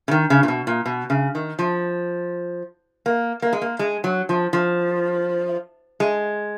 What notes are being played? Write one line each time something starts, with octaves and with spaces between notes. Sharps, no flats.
C#3
D#3
C#3
A#2
B2
A#2
B2
C#3
D#3
F3
A#3
A#3
G#3
A#3
G#3
F#3
F3
F3
G#3